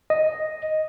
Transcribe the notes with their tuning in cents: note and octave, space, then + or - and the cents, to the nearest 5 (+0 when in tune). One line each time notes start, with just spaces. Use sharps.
D#5 +0